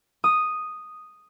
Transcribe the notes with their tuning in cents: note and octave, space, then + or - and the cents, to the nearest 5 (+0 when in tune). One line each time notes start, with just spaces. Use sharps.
D#6 -5